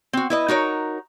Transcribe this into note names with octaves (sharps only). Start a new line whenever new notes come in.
C4 F#4
E4 B4 D#5
D#4 F#4 A#4 C#5